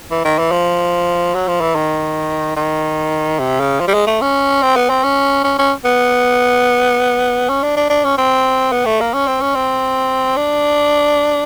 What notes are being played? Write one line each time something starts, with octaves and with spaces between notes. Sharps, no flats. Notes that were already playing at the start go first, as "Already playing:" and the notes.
E3
D#3
E3
F3
F#3
F3
E3
D#3
D#3
C3
C#3
F3
G3
G#3
A3
C#4
C4
B3
C4
C#4
C#4
C#4
B3
C#4
D4
D4
D4
C#4
C4
B3
A3
A#3
C#4
C4
C#4
C4
D4